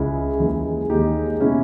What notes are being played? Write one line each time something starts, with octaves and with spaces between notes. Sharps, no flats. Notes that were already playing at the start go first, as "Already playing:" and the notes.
Already playing: C#2 C#3 G#3 E4 G#4
D#2 C#3 E3 G#3
D#2 D#3 G#3 D#4 G4
B2 G#3 C#4 E4